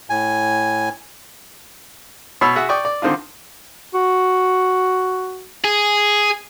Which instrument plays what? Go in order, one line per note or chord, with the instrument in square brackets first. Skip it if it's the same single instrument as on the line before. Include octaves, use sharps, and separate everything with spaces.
[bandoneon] A2 G#5
[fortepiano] B2 C#5 B5 E6
F#4 G#4 E5 F#5
D5 G5 C#6 D#6
D5
D3 D#3 C4 D4 F4
[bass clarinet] F#4
[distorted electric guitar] G#4